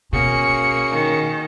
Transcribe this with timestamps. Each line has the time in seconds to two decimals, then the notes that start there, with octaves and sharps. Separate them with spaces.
0.13 B2 A#3 C#4 F#4 G#4 C#7
0.92 D#3